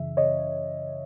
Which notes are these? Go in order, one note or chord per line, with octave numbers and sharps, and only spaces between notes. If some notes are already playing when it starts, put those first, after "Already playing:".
Already playing: F#2 C#3 E3 E5
C#3 C#5 D#5